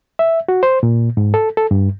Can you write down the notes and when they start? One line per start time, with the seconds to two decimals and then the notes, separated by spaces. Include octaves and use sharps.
0.19 E5
0.49 F#4
0.63 C5
0.83 A#2
1.17 G#2
1.34 A4
1.57 A4
1.71 G2